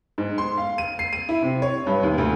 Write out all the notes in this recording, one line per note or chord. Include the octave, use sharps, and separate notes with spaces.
G#2
C6
F5
D#7
C7
D#7
E4
C3
C#5
G2
D#2
D2